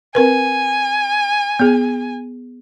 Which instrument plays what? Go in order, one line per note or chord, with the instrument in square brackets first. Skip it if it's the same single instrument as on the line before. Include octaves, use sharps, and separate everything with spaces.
[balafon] C4 A#4 B4 [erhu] G#5
[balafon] B3 G#4